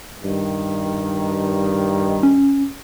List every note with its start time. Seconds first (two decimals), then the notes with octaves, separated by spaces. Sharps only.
0.23 G2 D#3
2.23 C#4